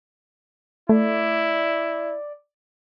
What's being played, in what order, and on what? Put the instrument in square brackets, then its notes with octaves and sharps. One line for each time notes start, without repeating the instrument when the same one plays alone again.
[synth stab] A3 [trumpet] E4 [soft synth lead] D5